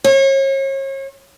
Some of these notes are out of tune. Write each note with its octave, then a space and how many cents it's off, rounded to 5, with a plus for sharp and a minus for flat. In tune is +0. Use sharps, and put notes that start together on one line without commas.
C#5 -35